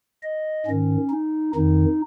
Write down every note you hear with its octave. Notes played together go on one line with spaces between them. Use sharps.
D#5
G#2 D#3 C#4
D#4
F2 D#3 D#4